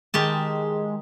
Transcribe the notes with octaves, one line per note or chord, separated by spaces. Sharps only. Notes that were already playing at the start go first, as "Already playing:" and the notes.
D#3 G#3 G4 A5